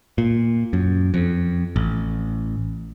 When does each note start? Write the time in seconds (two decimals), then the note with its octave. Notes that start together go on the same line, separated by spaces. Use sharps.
0.18 A#2
0.73 F#2
1.14 F2
1.76 A1